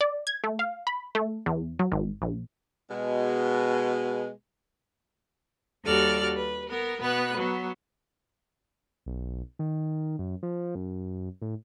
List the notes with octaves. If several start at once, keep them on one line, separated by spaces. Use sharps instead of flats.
D5
G#6
A3
F5
B5
A3
E2
F#3
G#1
A#1
B2 G#3
D#2 G3 F#4 A4 D5 F6
B4
B3 A#4
B2 B3 B4 F#6
F#3 B3
B1
D#3
F#2
F3
F#2
A2